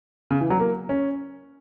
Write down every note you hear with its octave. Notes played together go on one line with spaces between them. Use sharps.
C#3
E3
F#3
A#3
C#4